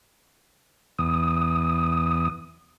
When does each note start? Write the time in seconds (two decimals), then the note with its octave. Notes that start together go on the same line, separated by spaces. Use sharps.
0.99 E2 D#6